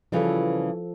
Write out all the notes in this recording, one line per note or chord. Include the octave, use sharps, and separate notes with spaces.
C#3 E3 F3 G3 A4